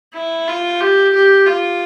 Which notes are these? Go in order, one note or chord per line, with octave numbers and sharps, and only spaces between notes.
E4
F4
G4
G4
F4